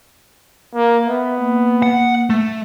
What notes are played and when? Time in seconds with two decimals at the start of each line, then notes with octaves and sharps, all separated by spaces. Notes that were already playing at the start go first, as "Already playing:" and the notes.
0.75 A#3
1.06 B3 E5
1.39 A#3
1.82 F#5
2.30 A3